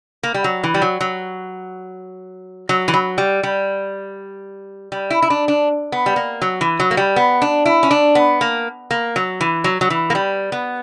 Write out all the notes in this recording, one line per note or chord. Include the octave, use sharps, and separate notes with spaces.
A#3
G3
F#3
E3
G3
F#3
F#3
F#3
E3
F#3
G3
G3
G3
E4
E4
D4
D4
B3
G3
A#3
F#3
E3
F#3
A#3
G3
B3
D4
E4
C#4
D4
B3
A#3
A#3
F#3
E3
F#3
F#3
E3
A#3
G3
B3